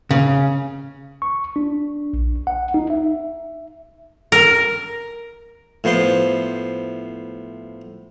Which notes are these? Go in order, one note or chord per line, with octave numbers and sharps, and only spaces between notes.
C#3
C#6
D4
A#1
F#5
D#4
E5
A#4
A2 F3 B3 C5 C6